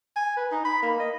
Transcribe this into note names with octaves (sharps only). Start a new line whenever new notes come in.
G#5
B4
D#4
B5
A#3
D#5